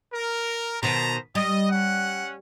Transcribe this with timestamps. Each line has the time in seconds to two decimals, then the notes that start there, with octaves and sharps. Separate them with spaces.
0.13 A#4
0.83 B2 D#3 C5 A5 A#5
1.35 G3 D#5
1.69 C#4 F#5